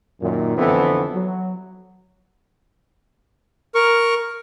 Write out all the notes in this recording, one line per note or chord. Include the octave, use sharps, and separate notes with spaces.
F#2 A#2 D#3
F2 D3 E3 B3 C4 A4
F#3
A#4 C#6